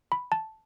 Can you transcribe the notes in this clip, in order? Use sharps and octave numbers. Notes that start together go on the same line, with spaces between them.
B5
A5